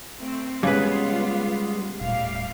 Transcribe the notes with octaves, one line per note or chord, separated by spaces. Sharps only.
A3 C4
C#3 G3 G#3 B3 F4 B4
D#1 A2 G3 F5